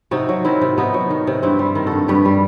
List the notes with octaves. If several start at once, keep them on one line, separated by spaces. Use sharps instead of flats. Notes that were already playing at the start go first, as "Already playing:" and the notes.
C3 D#4 F#4
F#3
D#3 C4 E4
C3
C3 B3 D#4
F#3
D#3
C3
G2 C4 E4
G3
D#3
F#4 A4
G2
G2 G4 B4
G3